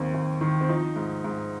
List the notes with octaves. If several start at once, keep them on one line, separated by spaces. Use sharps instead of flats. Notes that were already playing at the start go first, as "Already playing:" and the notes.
Already playing: D#2 D#3 C4
D#2
D#3
C4
F3 D#4
G#2
G#2